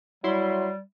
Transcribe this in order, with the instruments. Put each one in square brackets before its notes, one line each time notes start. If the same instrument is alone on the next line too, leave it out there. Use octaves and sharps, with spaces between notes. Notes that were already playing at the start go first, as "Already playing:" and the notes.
[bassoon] F#3 [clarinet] G3 [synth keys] E4 C6